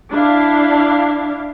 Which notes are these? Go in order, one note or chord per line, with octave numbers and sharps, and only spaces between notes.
D4 E4 F5